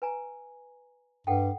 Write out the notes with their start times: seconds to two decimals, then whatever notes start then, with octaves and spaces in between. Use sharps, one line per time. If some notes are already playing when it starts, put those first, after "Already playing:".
0.02 B4 G#5 A#5
1.27 G2 A4 F#5 G5